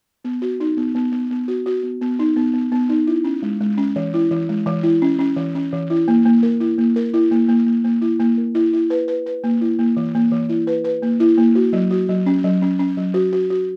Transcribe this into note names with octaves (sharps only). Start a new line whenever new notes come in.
B3
F#4
D#4
B3
B3
B3
B3
F#4
F#4
B3
B3
D#4
B3
B3
B3
D#4
E4
C#4
G#3
G#3
C#4
E3
E4
E3
G#3
E3
E4
C#4
C#4
E3
C#4
E3
E4
A#3
A#3
A#4
E4
A#3
A#4
E4
A#3
A#3
A#3
A#3
E4
A#3
A#4
E4
E4
B4
B4
B4
A#3
E4
A#3
E3
A#3
E3
E4
B4
B4
A#3
E4
A#3
F#4
F#3
F#4
F#3
C#4
F#3
C#4
C#4
F#3
F#4
F#4
F#4